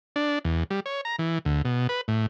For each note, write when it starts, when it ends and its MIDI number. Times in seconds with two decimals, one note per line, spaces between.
0.16 0.39 62
0.45 0.63 40
0.70 0.80 55
0.86 1.01 73
1.05 1.16 82
1.19 1.39 52
1.45 1.62 38
1.65 1.87 47
1.89 2.01 71
2.08 2.26 45